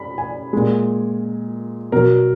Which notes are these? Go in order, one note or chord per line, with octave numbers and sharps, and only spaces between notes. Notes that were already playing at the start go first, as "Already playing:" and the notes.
Already playing: B5
G#5
A#2 G#3
B2 F#3 A#4